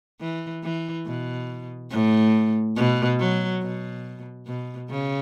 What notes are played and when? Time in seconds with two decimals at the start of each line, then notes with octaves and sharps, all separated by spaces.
0.21 E3
0.63 E3
1.06 B2
1.91 A2
2.77 B2
3.19 F#3
3.62 B2
4.47 B2
4.90 C#3